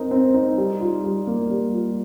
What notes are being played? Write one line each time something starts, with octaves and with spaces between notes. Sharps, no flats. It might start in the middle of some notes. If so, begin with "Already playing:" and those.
Already playing: C4 D#4 A#4
C4
D#4
G3
F4
G3
A#3
G3
F4